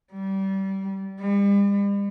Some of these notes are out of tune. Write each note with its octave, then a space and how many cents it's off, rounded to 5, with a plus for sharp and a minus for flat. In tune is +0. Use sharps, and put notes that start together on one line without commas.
G3 -25
G3 +40